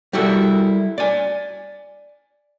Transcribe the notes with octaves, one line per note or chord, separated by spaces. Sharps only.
G3 E4 F#4 A4 A#4
D5 G#5